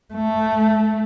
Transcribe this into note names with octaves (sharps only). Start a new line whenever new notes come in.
A3